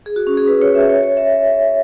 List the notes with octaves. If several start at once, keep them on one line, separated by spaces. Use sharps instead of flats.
G#4
F#4
C#4
G#4
B4
C#5
E5
C#5
C#5
E5